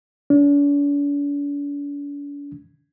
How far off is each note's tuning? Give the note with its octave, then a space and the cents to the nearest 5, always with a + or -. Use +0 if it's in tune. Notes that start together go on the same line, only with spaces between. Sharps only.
D4 -45